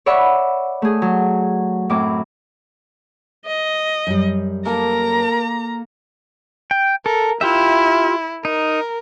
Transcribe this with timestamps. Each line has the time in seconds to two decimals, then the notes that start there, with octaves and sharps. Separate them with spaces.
0.06 C#5 D5 E5 F#5 B5 C#6
0.82 A3 G#4
1.02 F#3
1.89 F#2 A2 C4 D6
3.46 D#5
4.07 F#2 G3
4.65 A#3 A4 A#4 A#5
6.71 G5
7.06 A4 A#4
7.41 E4 F4 G4 E5
8.45 D#4 A#4